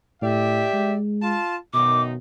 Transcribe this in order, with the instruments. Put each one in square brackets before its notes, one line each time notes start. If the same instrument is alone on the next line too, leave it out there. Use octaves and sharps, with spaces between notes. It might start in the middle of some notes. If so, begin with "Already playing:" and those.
[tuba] A2 [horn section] G4 D5 E5
[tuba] G#3
[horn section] F4 A5
[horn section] F#2 D#3 D#4 [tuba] B2 [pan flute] D6